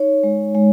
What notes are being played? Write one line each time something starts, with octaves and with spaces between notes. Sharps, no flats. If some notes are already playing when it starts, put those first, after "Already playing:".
Already playing: D#4 C#5
G#3
G#3